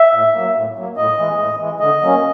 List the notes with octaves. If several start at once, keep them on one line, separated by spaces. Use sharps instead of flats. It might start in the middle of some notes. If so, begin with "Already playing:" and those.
Already playing: E5
A2
F#3 A#3
A2
F#3 A#3
A2 D#5
E3 G#3
A2
E3 G#3
D3 D#5
F#3 A#3 C#4